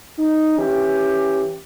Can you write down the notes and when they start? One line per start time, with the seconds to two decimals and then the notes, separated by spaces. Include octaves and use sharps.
0.19 D#4
0.58 E3 C#4 G4